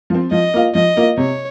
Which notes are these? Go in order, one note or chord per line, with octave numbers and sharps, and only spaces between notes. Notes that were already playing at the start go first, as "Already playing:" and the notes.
F3 C4
F3 D#5
A#3 F4
F3 D#5
A#3 F4
C3 C#5